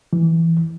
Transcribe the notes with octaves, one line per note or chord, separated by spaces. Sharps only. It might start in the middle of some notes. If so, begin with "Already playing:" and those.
E3